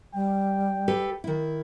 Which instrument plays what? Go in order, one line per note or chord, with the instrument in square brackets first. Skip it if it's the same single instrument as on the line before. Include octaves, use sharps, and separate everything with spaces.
[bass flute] G3 [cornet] G5
[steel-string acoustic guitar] G4 A4 B4
D#3 E4